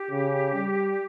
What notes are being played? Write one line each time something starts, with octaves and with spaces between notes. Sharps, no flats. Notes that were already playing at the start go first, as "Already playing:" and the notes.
Already playing: G4
C#3
G3